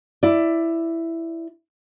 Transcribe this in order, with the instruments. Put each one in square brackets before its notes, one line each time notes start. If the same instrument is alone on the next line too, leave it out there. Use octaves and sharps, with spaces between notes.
[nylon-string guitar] E4 D5